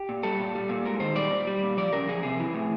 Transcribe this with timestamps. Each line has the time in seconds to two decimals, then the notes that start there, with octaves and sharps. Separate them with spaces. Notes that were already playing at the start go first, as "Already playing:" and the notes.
Already playing: G4
0.09 A#2
0.23 G3 A4
0.39 A#2
0.55 G3
0.69 A#2
0.85 G#3 A#4
1.00 D#3 C5
1.15 G3 D5
1.31 A#2
1.47 G3
1.63 A#2
1.77 F3 D5
1.93 C#3 A#4
2.08 F3 G#4
2.23 C3 G#4
2.40 E3
2.54 A2